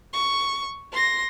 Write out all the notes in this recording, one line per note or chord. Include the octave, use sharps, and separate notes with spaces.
C#6
C6 A#6